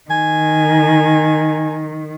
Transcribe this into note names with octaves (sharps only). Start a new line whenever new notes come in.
D#3 G#5